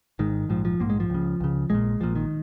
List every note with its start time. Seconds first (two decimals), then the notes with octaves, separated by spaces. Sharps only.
0.19 G#1 G#2 D#3
0.49 A#1 G#2 F3
0.65 F3
0.80 A#1 G#2 A#3
0.90 G#3
1.00 F3
1.10 C#2 C#3
1.40 C#2 C#3
1.70 A#1 A#2 G#3
2.00 A#1 A#2 F3
2.16 D#3